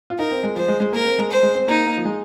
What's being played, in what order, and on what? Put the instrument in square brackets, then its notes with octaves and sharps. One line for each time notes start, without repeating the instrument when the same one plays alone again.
[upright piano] F4
[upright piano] D#4 [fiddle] A#4
[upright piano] C4
G#3
[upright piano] F3 [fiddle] C5
[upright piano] G#3
G#3
[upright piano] A#3 [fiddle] A#4
[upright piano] C4
G#3
[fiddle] C5
[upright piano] G#3
C4
[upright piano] A#3 [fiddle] D#4
[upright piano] A#3
F3
G#3